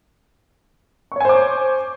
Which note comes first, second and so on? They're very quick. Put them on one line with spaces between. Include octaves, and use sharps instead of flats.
C#6 C#5 G#5 C5 D6